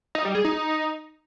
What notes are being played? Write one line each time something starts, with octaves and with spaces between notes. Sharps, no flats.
D#4
G3
G#4
D#4